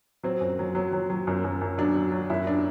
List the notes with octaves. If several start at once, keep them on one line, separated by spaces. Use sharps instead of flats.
F#3 C4
F#2
F#3
F#3
F#3
F#3
F#2
F#2
F#2
F#3 D4
F#3
F#3
F#2 E4
D4